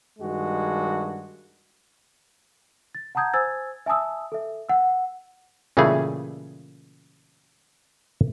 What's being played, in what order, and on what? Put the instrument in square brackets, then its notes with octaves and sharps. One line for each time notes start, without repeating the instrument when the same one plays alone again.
[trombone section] G2 D#3 G#3 F#4
[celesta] A6
F#5 A5 A#5 D#6 G6 G#6
C5 G#5 E6 G#6 A6
E5 G#5 A5 D#6 E6
A4 E5
F#5 E6
[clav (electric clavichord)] A#2 C#3 E3 G3 A3 G#4